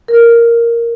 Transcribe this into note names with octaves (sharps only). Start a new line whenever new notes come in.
A#4